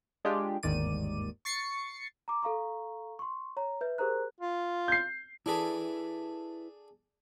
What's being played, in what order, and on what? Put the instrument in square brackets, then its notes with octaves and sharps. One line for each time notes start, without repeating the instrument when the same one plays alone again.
[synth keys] G#3 D4 F4 G4
G1 D#2 G#2 D#3 D5 D#7
C#6 A6 C7 C#7
[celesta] A#5 D6
A4 F5 A#5 C#6
C6 C#6
C#5 A#5
B4 E5 G6
G4 G#4 A#4 C5 A#5 F#6
[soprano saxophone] F4
[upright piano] G6 C7
[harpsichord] D4 G#4 A4 [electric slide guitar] E4 B4